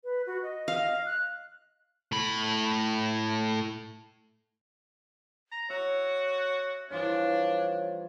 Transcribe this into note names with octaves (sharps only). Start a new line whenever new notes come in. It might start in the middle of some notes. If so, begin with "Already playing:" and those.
B4
F#4
D#5
F5
F#6
A2 B5
A#5
F#4 C#5 E5
G2 E3 F3 D4 C#5